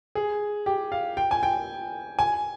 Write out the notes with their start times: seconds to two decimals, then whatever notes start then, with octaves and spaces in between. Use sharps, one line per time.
0.15 G#4
0.66 G4
0.92 F5
1.17 G5
1.31 G#5
1.43 G5
2.19 G#5